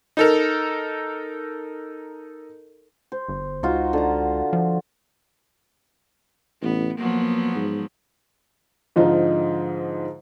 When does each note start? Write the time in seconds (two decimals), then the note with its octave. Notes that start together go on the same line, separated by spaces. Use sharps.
0.17 D#4 A4 A#4
3.12 C5
3.29 G1
3.63 C#2 D#4 F4 F#4
3.93 D3 A#5
4.53 F3
6.62 A1 B3
6.98 F3 F#3 A#3 B3
7.55 G#2
8.96 G#2 D3 F3 D#4 F4